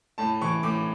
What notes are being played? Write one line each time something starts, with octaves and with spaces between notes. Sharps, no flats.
A2 A5
E3 C#6
A2 D6